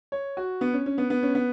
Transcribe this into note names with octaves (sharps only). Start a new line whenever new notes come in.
C#5
F#4
B3
C#4
C#4
B3
B3
C#4
B3